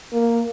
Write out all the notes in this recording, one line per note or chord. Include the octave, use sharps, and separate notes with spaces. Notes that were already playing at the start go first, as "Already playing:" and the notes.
A#3